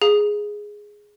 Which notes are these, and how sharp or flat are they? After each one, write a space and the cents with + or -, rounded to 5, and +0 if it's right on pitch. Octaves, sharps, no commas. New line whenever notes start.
G#4 +0 F5 +10 A#5 +0